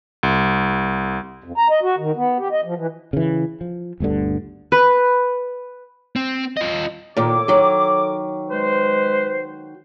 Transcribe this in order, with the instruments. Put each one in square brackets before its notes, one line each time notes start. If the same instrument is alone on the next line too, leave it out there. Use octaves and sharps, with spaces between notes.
[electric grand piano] C2
[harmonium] F2
A#5
D#5
F#4
D#3
B3
G4
D#5
F3
E3
[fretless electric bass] C#3 E3
F3
G1 D2 G2 D3
[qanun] B4
[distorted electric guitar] C4
F4 D#5
[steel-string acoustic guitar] A#2 D#3 [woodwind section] A4 C#5 D6
[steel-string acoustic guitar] D#3 F#3
[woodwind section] G#3 B4 C5